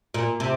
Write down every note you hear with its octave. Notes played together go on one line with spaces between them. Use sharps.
A#2
C3